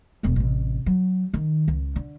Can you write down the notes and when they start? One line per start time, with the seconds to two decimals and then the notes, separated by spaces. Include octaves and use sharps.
0.23 E1 G#3
0.36 A1 C3
0.86 F#3
1.34 D#3
1.68 C#2
1.96 D3